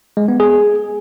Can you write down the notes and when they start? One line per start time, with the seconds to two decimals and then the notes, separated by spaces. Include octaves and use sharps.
0.17 G#3
0.28 B3
0.40 G#4